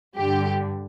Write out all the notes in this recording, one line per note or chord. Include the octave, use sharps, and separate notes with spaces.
G2 D3 G4